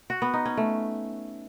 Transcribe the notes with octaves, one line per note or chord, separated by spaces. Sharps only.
F#4
B3
D#4
C#4
A3